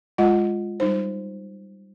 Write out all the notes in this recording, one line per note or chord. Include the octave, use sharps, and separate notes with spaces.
G#3 F4 D#5 F#5
G3 D#4 C5